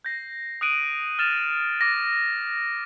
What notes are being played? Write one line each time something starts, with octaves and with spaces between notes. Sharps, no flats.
G6 A#6 C7
D#6 F#6 D7 D#7 F#7
F6 A6 E7 F7
D6 A#6